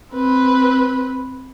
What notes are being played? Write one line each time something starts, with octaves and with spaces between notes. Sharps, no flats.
C4 B4